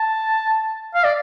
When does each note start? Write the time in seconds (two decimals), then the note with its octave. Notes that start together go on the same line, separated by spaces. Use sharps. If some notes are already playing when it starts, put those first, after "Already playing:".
Already playing: A5
0.94 F5
1.04 D5